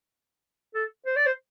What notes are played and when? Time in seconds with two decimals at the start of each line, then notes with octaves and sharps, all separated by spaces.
0.75 A4
1.06 C5
1.16 D5
1.26 C5